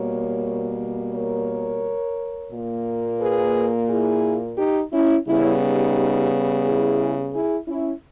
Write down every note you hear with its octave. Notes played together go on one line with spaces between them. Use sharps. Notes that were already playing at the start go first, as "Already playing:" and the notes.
Already playing: B2 G3 A#3 A#4 C#5
A#4 C#5
A#2 A#3
G#4 B4
E4 G#4
D#4 G4
C#4 E4
C#3 G3 B3 C#4 E4
D#4 G4
E4 G#4
E4 G#4
C#4 E4